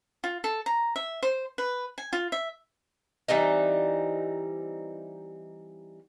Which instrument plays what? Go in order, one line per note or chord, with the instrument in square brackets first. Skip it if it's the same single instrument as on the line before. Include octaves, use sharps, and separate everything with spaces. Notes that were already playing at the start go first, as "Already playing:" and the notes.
[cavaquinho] F4
A4
A#5
E5
C5
B4
G#5
F4
E5
[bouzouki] E3 G3 C4 D#4